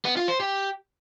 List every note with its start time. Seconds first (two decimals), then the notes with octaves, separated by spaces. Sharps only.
0.05 B3
0.16 F4
0.28 C5
0.40 G4